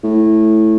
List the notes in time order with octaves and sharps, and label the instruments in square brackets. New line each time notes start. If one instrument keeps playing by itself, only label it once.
[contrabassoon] A2